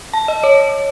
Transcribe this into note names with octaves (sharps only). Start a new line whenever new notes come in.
A5
D#5
C#5